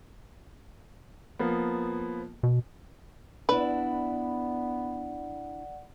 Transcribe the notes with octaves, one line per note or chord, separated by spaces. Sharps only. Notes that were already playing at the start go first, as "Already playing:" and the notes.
F3 A#3 B3
B2
B3 D4 E4 B4 D5 F#5